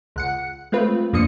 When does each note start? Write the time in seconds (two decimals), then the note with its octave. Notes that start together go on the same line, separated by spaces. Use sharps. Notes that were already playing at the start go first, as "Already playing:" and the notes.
0.16 C#2 F#5 C#7
0.72 G#3 A3 C4 F4 B4
1.13 F2 F3 A#3 D4 D#6 C#7